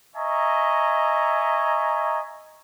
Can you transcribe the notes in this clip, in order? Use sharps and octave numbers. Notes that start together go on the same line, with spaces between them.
D#5 E5 G#5 A#5 C#6